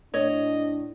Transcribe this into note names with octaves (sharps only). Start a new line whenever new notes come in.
A2 D4 C#5 D#5